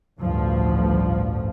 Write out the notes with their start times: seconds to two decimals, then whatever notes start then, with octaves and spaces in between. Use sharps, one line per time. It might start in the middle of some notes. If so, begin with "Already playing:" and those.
0.21 A1 D2 G2 F3